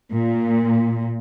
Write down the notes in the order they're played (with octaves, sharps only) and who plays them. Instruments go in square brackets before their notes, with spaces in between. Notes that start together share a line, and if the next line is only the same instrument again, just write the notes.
[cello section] A#2